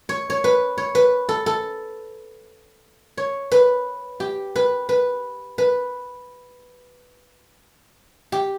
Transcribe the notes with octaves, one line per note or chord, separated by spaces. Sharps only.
C#5
C#5
B4
C#5
B4
A4
A4
C#5
B4
G4
B4
B4
B4
G4